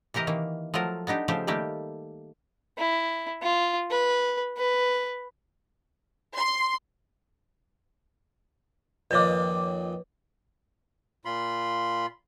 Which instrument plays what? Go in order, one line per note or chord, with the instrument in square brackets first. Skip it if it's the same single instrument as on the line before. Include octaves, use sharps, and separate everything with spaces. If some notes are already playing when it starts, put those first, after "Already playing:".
[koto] C3 E3 G4 A#4 D#5
D#3 E3 A#3
F3 F#3 A3 F4 A#4
B3 D4 D#4 G4
C#3 F3 A3 G4 C5
D#3 G3 A3 A#3 G4
[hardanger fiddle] E4
F4
B4
B4
[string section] C6
[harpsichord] F2 A#2 D#3 [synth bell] B4 C#5 D6
[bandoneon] A#2 F4 B5 C6